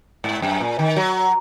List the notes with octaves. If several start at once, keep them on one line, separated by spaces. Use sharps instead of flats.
G#2
F#2
A#2
D#3
F#3